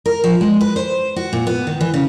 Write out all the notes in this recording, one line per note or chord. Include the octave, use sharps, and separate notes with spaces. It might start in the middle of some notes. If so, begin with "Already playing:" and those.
A#4
F3
G#3
B4
C5
F#4
A#2
B3
D#3
E3
C#3